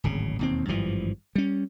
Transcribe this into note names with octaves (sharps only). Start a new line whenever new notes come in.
D1 G#1 C#3
E1 D#2 C4
G#1 G2 E3 F3
G3 C#4